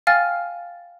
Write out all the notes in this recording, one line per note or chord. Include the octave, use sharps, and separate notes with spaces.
F5 G5 G#5 F6 A6